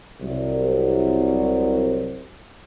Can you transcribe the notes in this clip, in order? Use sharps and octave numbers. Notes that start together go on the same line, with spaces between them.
C2 F#3